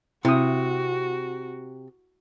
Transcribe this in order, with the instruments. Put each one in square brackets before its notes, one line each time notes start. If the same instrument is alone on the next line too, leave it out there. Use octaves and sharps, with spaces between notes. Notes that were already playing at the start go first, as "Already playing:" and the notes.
[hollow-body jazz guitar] C3 [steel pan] E4 D#6 [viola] F#4